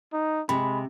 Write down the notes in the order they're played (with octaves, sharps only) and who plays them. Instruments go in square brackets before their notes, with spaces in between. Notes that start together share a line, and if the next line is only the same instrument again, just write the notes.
[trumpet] D#4
[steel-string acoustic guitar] C3 [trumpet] G#3 [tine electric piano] B5